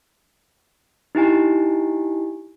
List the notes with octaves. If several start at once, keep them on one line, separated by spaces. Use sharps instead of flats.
D#4 E4 G4 G#5